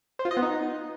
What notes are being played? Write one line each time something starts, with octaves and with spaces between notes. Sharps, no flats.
C5
F4
D#5
B3
D#4